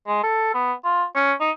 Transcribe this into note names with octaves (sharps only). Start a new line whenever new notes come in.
G#3
A4
B3
F4
C#4
D#4